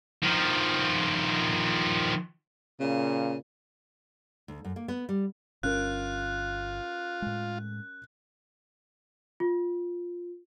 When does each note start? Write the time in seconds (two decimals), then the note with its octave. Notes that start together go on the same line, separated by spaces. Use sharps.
0.24 D#3 F3
2.80 A#2 C#3
4.48 D2
4.65 F#2
4.76 A#3
4.88 B3
5.09 G3
5.63 G1 C#4 F4 A#4 F#6
7.22 A2 G#3
9.40 F4